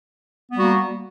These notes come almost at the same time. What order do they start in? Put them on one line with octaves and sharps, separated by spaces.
B3 G3 F#4 A#3